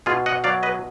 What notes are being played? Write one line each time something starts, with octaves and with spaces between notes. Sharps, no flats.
B2 F4 G#4
D#5 F#5
F#3 D5 F5
B4 D#5